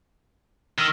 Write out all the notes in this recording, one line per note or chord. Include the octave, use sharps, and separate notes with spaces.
D#3 E6 F6